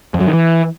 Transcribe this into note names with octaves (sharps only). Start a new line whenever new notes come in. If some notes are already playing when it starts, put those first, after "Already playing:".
F2
F#2
D#3
E3